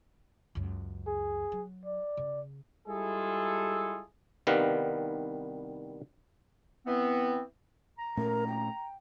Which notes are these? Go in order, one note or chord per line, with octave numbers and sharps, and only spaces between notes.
C#2 F#2
G#4
F#3
D5
C#3
G3 G#3 E4 F4 G#4 A4
C2 D#3 G3 B3 B4 F5
E3 B3 C4
A#5
A#2 A3 C#4 A#4
G5